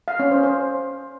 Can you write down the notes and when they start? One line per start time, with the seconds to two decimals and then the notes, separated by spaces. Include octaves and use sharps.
0.08 F5
0.19 C#4
0.31 C5
0.43 C5